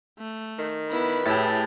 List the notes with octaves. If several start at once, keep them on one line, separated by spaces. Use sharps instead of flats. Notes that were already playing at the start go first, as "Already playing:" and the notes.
A3
D#3
B3 E4 B4
A2 E4 G4 G#4 A5